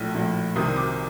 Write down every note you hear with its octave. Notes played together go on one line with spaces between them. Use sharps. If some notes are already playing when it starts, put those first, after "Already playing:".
Already playing: A#1 A2
A#1 A2
C2 C3 D#3 D#6
D6